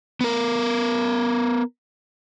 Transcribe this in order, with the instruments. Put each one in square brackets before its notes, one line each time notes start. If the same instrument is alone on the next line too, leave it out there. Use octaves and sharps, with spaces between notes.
[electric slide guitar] B3 A#4